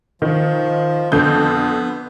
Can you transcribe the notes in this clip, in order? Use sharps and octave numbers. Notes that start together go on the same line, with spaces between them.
D#3 F3
F2 D3 B3 G6